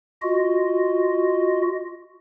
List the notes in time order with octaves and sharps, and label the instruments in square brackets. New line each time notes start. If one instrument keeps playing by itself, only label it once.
[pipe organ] F4 F#4 D#5